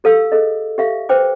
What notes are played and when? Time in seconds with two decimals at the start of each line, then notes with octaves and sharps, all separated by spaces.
0.04 G4 A4 F5 E6
0.32 G#4 A4 D#5
0.78 G4 A4 E5 F5
1.09 B4 C5 G5 D6